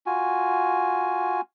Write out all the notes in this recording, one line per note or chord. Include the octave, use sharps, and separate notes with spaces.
F4 F#4 G#5